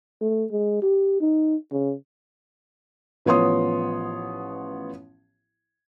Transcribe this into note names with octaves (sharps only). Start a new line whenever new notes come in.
A3
G#3
G4
D#4
C#3
A1 F3 B3 C#5 C6 D#6